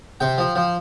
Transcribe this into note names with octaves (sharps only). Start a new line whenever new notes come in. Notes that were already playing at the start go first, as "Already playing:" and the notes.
C3 G5
F3
F3